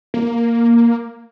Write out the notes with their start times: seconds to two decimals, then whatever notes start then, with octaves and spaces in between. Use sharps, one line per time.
0.14 A#3